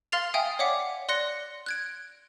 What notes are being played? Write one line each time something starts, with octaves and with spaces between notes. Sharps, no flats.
F5 C6 F6 A6 C7 F7
E5 F5 G5 G#5 D#6
C#5 D5 F5 F#5 D6 B6
D5 C6 F#6 A#6 C#7
F#6 G#6 D7